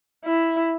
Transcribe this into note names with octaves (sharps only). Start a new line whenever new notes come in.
E4